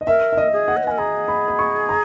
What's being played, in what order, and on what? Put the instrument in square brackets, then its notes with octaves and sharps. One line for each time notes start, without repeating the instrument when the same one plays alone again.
[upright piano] D#5
[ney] A#4 [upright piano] E5
[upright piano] E5
D#5
[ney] G#4
[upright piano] F#5
[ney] C#5
B4
[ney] A#4 [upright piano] G#5
[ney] G#4 [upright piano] A#5
[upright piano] B5
B5
C#6
A#5